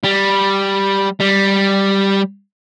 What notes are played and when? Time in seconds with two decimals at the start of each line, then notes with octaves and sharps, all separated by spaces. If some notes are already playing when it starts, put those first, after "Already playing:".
0.04 G3
1.20 G3